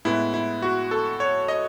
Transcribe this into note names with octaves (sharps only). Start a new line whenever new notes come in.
A2 G#3 B3 E4
E4
F#4
A4
C#5
D#5